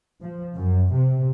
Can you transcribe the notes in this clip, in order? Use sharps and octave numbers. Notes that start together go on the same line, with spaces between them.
F3
F#2
C3